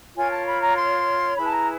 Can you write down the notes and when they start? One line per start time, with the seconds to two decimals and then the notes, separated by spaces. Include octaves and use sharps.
0.16 F4 A#4 C#5 G#5
0.30 A5
0.47 B5
0.61 A#5
0.76 C6
1.36 E4 G#4 B4 B5
1.46 A5
1.51 A#5